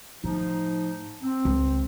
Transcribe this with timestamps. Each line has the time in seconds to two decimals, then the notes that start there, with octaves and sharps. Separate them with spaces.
0.24 A2 F3 D#4
1.22 C4
1.45 C#2